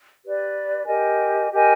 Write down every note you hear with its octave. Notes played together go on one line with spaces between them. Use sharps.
G4 B4 D5
G4 A#4 D#5 G#5
G4 A#4 D#5 G#5